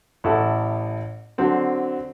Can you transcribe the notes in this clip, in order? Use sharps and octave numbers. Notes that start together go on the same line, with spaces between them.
A1 E4 A4 F#5
D3 F#3 C4 C5